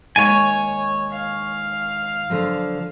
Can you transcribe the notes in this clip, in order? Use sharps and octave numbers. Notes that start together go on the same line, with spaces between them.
D#2 G#3 C#5 F#5 G#5
F5
D3 F3 F#3